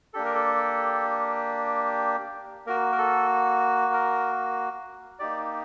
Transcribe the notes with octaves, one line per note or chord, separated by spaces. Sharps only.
A#3 D4 G4 A4
A#4
A4
A#3 F#4 A#4
A#4
A4
A#4
A#3 D#4 G4 D5